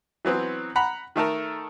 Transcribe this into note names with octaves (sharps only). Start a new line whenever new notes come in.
E3 F#3 B3 C4
F#5 A#5 B5
D#3 A3 A4 A#4